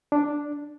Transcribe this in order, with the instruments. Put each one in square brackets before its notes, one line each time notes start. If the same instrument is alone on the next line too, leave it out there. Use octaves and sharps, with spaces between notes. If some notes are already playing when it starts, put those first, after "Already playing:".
[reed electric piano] D4